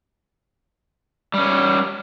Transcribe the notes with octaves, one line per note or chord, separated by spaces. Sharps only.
G3 C#4